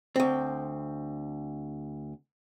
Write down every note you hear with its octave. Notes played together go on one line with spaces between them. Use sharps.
D2 C4